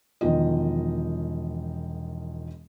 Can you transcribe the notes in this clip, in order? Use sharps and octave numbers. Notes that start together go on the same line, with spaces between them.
E1 D#3 F3 D#5